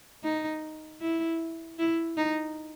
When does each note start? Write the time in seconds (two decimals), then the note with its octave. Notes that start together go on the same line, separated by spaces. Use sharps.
0.23 D#4
1.01 E4
1.79 E4
2.17 D#4